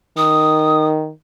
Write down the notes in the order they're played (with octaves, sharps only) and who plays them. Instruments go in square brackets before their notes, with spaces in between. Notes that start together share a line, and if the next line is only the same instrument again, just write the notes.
[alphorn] D#3 [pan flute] D#6